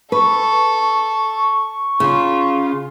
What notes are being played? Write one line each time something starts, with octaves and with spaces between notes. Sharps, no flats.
A4 B4 C#6
C#3 F4